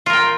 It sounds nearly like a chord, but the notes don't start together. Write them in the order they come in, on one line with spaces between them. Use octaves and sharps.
F4 A#4 G5